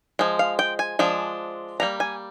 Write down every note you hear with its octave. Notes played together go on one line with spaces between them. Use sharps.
F3 G#3
F5
G5
G#5
F3 G#3 D4
G3 A#3 D4 A#5
G#5